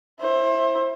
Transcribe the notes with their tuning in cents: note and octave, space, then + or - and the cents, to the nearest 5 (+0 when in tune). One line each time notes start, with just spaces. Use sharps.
E4 +0 C5 +30